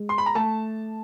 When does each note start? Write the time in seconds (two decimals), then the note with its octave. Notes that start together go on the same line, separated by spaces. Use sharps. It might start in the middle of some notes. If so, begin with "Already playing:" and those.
Already playing: G#3
0.09 C6
0.18 B5
0.26 A#5
0.35 A3 A5